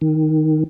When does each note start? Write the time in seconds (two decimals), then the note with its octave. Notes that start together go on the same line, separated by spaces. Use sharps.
0.01 D#3